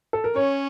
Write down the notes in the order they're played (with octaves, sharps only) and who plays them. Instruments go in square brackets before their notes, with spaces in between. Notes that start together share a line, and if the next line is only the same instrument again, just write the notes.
[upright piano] A4
A#4
[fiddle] C#4 [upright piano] C#5